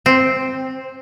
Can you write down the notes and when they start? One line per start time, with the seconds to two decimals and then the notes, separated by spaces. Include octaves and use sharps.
0.06 C4